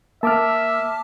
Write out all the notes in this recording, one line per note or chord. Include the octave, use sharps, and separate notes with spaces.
A#3 E5 A5 D6 F6